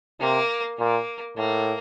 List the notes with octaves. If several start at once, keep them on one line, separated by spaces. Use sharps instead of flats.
C3 A#3
A#2 A#3
A2 A#3